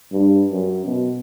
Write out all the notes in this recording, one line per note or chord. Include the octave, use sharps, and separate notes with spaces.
G2
F#2
B2